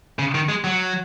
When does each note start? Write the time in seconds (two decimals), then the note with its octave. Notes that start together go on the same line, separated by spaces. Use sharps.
0.19 C#3
0.35 D#3
0.49 G#3
0.64 F#3